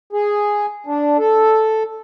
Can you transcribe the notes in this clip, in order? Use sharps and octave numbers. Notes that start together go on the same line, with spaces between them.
G#4
D4
A4